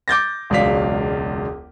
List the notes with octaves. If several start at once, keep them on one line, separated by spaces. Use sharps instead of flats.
D6 G6 A6 A#6
E1 C#2 F#3 D5 F5 B6